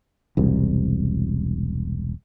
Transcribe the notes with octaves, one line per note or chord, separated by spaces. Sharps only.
E1 C2